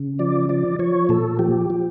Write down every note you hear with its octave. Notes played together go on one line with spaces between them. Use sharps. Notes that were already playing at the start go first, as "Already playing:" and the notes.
Already playing: C#3
F3 D5
F3 D5
F3 C#5
A#2 A4
F3 G4
F3